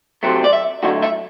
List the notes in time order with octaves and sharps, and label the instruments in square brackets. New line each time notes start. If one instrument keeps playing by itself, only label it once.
[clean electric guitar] C3 F#3 A3 C4
D5
E5
F#2 D3 A3 E4 F#4
E5